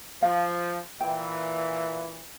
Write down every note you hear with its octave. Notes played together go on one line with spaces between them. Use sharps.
F3 F5
A#2 E3 G5